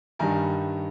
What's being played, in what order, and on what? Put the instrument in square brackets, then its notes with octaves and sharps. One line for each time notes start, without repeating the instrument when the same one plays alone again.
[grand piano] G2 D#3 G3 G#5 A#5